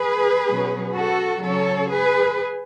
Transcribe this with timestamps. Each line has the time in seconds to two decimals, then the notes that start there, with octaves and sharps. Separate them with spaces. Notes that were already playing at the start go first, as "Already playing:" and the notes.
Already playing: G#4 B4
0.47 B2 F#3 C#4
0.95 F#4 A4
1.43 C#3 F#3 C#4 A4 C#5
1.91 G#4 B4